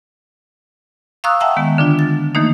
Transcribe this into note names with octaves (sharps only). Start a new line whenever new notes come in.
F5 A#5 C#6 D#6 E6 F#6
E5 F#5 G5 A5 A#5 E6
D#3 G#3 B3
D3 D4 F4
A6
D#3 E3 A3 A#3 D#4